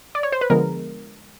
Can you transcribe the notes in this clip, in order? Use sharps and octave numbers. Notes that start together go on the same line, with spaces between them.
D5
C#5
C5
B4
D3 F3 G#3 B3 A#4